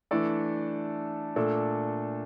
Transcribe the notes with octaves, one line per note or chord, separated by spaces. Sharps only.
E3 A3 D4 A4 D5
A#2 A3 D4 A4